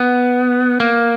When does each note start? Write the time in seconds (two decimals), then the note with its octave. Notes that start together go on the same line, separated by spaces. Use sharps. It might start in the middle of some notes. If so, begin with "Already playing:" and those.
Already playing: B3
0.80 A#3